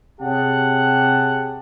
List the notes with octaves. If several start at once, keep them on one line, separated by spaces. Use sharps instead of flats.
C3 G4 G#4 C#5 F#5 A5